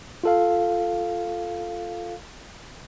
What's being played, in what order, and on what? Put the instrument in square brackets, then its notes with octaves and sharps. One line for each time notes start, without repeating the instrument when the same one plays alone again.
[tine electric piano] F4 A4 F5